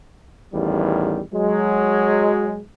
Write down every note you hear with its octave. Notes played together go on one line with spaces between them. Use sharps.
A1 E2 D#3 G3
F#3 G#3